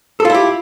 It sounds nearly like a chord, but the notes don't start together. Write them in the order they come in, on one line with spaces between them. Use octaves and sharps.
A4 F4 E4 G4